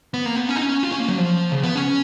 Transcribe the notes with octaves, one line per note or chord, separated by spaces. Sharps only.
B3
A#3
B3
C#4
D#4
C#4
F4
C#4
A#3
F#3
F3
C#3
B3
C#4